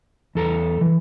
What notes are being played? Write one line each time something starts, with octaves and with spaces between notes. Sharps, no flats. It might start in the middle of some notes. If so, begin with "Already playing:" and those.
E2 A4 A#5
E3